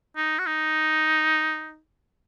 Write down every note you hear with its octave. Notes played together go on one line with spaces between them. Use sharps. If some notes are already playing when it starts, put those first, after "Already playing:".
D#4
F#4
D#4